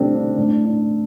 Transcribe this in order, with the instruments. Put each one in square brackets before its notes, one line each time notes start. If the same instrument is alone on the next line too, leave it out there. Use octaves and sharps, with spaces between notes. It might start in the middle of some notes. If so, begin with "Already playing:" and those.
Already playing: [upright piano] G3 A3 C4 D4
D4
A2 D4
D4